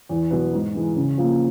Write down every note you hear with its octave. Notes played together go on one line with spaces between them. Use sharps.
E2
B2 F#3 B3
G#2
E3 G#3
C#3
F3 A#3